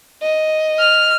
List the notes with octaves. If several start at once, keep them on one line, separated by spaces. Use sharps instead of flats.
D#5
F6